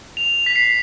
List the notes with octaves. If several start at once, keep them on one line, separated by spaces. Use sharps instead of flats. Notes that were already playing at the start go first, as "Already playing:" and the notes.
F7
B6
C7